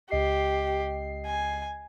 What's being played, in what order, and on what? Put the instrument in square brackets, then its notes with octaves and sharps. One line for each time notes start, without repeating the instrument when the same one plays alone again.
[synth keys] C#2 D#5 C7 [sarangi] G4
[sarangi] G#5